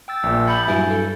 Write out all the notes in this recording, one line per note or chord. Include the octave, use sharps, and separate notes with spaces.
G5 E6 A6
A#1 A#2
B5 G6 A6 C#7
G2 F#3 E4 E5 G#5
A4